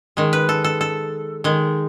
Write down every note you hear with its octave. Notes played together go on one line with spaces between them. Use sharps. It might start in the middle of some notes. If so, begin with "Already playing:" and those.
D#3 G#3
B4
A4
A4
A4
D#3 G#3